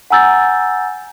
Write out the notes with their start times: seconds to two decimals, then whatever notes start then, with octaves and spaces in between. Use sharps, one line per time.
0.10 F#5 G#5 A#5 E6 G6 A6